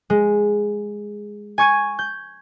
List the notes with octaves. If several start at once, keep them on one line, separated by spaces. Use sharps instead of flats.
G#3
G#5 C#6 G#6 D#7
G6